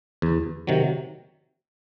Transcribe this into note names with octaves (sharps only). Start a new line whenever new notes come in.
E2
C3 D#3 F#3